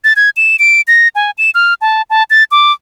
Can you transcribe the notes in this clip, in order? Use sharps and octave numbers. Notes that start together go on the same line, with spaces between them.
A6
G#6
E7
D7
A#6
G#5
E7
F6
A5
A5
A6
D6